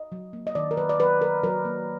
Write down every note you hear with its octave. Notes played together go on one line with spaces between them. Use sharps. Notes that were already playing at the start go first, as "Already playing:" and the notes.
Already playing: D#5
F#3
A#3
D#5
D#3 D5
A#4
F#3 B4
D5
F#3 B4
F#3 A#4
F#3 A#4
A#3